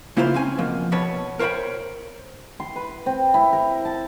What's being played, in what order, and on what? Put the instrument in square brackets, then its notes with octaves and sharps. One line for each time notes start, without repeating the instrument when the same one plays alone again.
[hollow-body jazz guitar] C#3 A#3 E4 F4 G#4 C5
C4 C#4 G#5
B2 F3 A#3
B2 B4 C#5 A5
A#4 C5 C#5 E5 G5 B5
[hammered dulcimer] C6
B4
C4
E4
A#4
A5